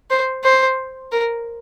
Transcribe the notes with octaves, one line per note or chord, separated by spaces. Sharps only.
C5
C5
A#4